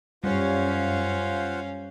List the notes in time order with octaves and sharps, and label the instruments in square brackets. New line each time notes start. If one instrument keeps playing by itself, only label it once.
[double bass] F#2 [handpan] G3 C#5 [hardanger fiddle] C#4 F5 [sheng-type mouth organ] F4 C5 F#5